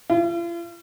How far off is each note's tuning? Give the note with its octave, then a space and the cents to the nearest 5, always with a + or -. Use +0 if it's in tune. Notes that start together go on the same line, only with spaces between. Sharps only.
F4 -45